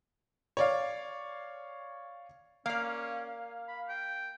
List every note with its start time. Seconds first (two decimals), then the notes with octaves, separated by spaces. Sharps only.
0.57 C#5 D5 F5
2.66 A#3 C#4 D5 F5
3.68 B5
3.89 G5